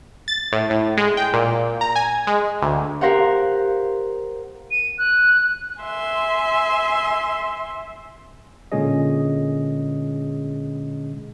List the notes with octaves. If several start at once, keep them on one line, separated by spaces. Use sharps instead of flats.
A6
A2
A2
G#3
G5
A#2
A#5
G#5
G#3
D2
G4 A#4 C5 F5 F#5
D#7
F#6
E5 G#5 C6
A#2 D3 G#3 C#4 G#4 D#5